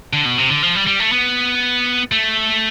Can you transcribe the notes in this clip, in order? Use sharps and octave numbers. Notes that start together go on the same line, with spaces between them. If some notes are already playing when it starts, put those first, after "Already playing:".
D3
B2
C3
D3
F3
G3
G3
A3
B3
A3